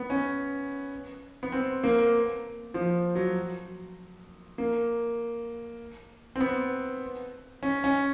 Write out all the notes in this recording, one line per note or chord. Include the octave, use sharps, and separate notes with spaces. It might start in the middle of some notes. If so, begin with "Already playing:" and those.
Already playing: B3
C#4
B3
C4
A#3
F3
F#3
A#3
C4
B3
C#4
C#4